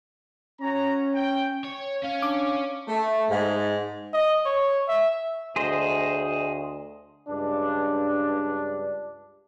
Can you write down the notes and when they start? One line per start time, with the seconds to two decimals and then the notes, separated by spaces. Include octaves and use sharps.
0.61 C#4 F#4 C#5 A#5
1.14 G5
1.64 C#5
2.03 C#4 F5
2.22 D4 D6
2.88 A3
3.30 G#2
4.13 D#5
4.45 C#5
4.88 E5
5.56 D2 G#4 C5 D#5
7.29 C#2 G2 D4